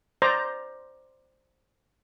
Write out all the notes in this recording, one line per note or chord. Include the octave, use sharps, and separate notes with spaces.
C5 D5 A#5